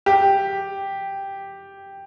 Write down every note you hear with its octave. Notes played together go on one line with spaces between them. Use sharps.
G4